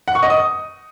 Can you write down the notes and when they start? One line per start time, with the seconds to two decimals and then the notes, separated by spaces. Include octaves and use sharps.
0.08 F#5
0.15 C#6
0.23 D#5
0.30 D#6